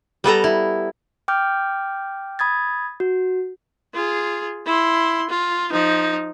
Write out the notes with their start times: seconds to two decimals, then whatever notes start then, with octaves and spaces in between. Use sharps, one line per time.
0.24 G3 B3 A4 A#5
0.44 E4
1.28 G5 D6 F6 G6
2.39 B5 D#6 G#6 A6
3.00 F#4
3.94 F4 G#4
4.66 E4 C6
5.30 F4
5.71 F3 D#4